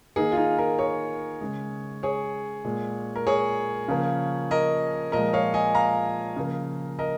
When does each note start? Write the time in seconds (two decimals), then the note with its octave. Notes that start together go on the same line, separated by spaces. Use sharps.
0.16 D#3 A#3 D#4 G#4
0.32 F4
0.37 D#4 G#4
0.58 F4 A#4
0.78 G#4 C#5
1.41 C#3 G#3
2.03 G#4 C#5
2.65 A#2 G#3
3.16 A#4
3.27 G#4 C#5
3.88 C#3 F3 A#3
4.51 A#4 D#5
5.12 A#2 F3 G#3 A#4 D#5
5.33 C#5 F5
5.54 D#5 G#5
5.75 F5 A#5
6.36 C#3 F3 A#3
6.99 A#4 D#5